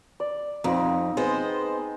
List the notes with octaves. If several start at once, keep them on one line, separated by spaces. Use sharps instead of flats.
D5
F2 C4 D#4
G#3 B3 C5 D#5